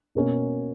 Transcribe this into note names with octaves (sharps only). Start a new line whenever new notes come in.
B2 A#3 C#4